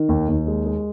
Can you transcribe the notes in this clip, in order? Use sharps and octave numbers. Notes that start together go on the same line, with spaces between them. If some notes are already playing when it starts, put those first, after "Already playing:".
Already playing: D#3
D#2
D#2
G#3
G#3